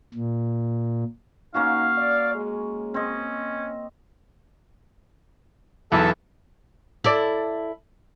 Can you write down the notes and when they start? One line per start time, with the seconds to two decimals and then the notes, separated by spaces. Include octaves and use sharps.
0.14 A#2
1.54 A#3 C#4 D#4 F#4 F5
1.98 D5
2.35 G#3
2.94 C4 C#4 D#5
5.92 B1 E2 A4 E5 A5
7.04 E4 A4 D5